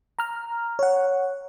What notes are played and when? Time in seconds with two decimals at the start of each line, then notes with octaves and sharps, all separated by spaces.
0.19 A#5 F6
0.79 C#5 F#5